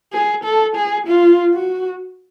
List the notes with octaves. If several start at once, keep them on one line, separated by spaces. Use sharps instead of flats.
G#4
A4
G#4
F4
F#4